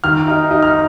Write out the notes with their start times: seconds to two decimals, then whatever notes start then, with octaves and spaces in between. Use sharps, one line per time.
0.04 D#3 F6
0.28 D#4
0.51 D#4
0.62 F6